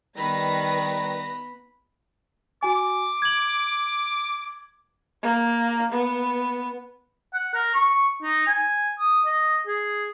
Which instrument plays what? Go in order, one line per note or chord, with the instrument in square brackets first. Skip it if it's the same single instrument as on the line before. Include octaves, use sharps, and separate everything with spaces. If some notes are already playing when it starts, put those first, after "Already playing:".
[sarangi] D#3 [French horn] G3 [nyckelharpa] B3 B5 [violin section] B4 A#6
[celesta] F#4 G#5 [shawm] D6
[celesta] G#6 F#7
[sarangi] A#3
B3
[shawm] F#5
A#4
C#6
D#4
G#5
D#6
D#5
G#4